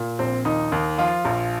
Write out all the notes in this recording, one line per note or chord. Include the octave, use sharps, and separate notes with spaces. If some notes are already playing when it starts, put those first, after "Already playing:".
Already playing: A#2
A#1 C4
D#2 D#4
D#2
F3 F4
A#1